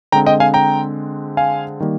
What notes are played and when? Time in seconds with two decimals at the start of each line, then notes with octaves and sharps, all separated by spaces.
0.12 D3 G#3 C4 G5 A#5
0.26 D#5 G5
0.40 F5 G#5
0.54 G5 A#5
1.37 F5 G#5
1.80 D#3 G3 A#3